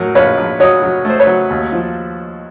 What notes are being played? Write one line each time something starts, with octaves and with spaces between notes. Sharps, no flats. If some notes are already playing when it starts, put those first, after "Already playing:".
Already playing: A2 F#3 A#4
A#1 B4 C#5
A#1
F#3 C#5 D#5
F#3
A3 C5
B4 C#5
F#3
D#2
F3